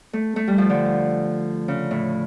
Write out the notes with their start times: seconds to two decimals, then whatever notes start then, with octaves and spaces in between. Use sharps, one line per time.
0.13 A3
0.36 A3
0.47 G3
0.58 F3
0.69 D3
1.68 C#3
1.91 A2